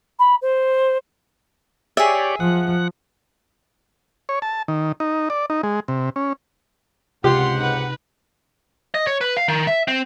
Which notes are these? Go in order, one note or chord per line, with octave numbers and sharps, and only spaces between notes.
B5
C5
G4 G#4 C#5 D5 E5
F3 F#5
C#5
A5
D#3
D#4
D5
D#4
G#3
C3
C#4
C#2 G#2 C3 F4 G4 F#5 C6
D#4 B4
D#5
C#5
B4
F5
D#3
E5
C4